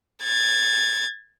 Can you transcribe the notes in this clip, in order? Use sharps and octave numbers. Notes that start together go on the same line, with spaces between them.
G#6 A6